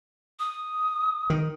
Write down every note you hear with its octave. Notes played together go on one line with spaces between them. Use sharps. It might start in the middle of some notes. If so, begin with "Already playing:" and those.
D#6
D#3